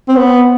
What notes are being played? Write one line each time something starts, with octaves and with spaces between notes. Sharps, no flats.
C4
B3